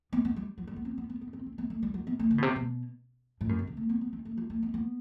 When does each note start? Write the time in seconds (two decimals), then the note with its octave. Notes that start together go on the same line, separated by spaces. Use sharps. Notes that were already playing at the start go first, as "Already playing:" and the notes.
0.13 B3
0.25 B3
0.36 G3
0.58 F#3
0.67 G3
0.76 B3
0.85 C4
0.98 B3
1.09 B3
1.21 B3
1.33 C4
1.46 C4
1.58 B3
1.70 A3
1.83 G3
1.94 F#3
2.07 B3
2.19 A3
2.31 D3
2.38 B2
2.43 C3
2.56 B2
3.41 A2
3.49 F#2
3.59 B2
3.67 C3
3.77 A3
3.89 B3
4.01 B3
4.13 C4
4.25 A3
4.38 F#3
4.50 A3
4.63 B3
4.74 B3